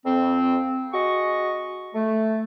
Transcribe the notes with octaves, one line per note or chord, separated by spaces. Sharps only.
F2 C4
F#4 G#4 D#5 C#6
A3